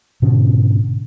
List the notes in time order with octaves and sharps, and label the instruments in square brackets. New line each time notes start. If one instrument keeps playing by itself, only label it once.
[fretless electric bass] G#2 B2 D3 C#4